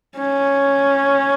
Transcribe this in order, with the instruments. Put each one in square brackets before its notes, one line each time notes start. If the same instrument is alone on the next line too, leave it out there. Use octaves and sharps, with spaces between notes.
[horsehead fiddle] C#4